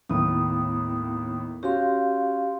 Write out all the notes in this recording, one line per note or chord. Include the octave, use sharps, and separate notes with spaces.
D#2 A2 B3 E4 D#6
C#4 F#4 G4 F5 C6